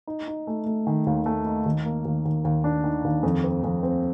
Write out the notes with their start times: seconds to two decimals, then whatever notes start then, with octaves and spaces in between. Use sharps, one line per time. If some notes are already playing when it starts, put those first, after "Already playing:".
0.07 D#4
0.28 D#4
0.47 A3
0.66 A3
0.87 D#3
1.07 D#2
1.26 A3
1.46 D#4
1.66 D#2
1.85 A#3
2.05 D#2
2.25 D#2
2.44 D#2
2.64 D4
2.84 D#3
3.04 D#2
3.23 F2
3.44 C4
3.64 F2
3.83 C4